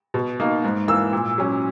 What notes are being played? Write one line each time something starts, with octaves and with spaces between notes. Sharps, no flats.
B2
A#3 D#4
G#2
E3 A#3 E6
A#2
F#3 C#4